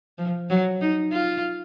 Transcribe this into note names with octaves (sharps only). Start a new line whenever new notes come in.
F3
F#3
D#4
F4